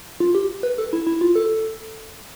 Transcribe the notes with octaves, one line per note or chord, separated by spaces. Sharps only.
F4
G4
B4
A4
E4
E4
F4
A4